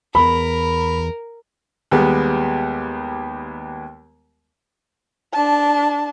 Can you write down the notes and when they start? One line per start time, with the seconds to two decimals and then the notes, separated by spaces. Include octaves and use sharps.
0.15 E2 A#4 B5
1.91 D#2 G3 G#3 B3
5.33 D4 A5